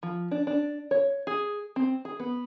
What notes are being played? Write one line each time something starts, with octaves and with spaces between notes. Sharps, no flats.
F3
D4
D4
C#5
G#4
C4
G#4
B3